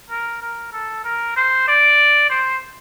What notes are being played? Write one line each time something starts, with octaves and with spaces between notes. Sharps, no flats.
A#4
A#4
A4
A#4
C5
D5
C5